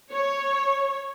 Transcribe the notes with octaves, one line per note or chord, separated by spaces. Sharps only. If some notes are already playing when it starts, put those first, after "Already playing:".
C#5